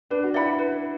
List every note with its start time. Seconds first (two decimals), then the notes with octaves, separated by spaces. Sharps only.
0.10 D4 B4
0.23 F#4
0.34 E4 D5 F#5 B5
0.59 B4